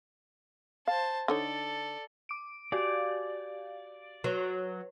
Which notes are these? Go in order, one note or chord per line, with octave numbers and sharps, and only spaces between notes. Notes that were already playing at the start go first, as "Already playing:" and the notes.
C5 F5 A5
D3 D#4 A4 C#5 D5
D6 D7
F#4 G4 D5 F5
F#3 B4